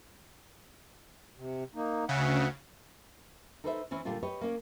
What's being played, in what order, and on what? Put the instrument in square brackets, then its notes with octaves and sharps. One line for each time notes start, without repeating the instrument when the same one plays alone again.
[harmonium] C3
A#3 D#4
[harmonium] D2 E5 F#5 [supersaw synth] C#3
[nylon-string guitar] D#4 A4 B4 C5 D#5 E5
E3 C4 C#4 E4
A#2 D3 G3 D4 F4
G4 B4 C#5 D#5
A#3 C#4 D5